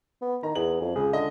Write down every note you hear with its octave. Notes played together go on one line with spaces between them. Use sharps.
B3
D#3 A#5
E2 F#7
F2
C#2 G#4
D3 D#5